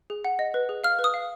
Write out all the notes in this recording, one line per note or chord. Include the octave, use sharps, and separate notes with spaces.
G#4
F#5
D#5
B4
G#4
F5 F6
B4
D#6
F5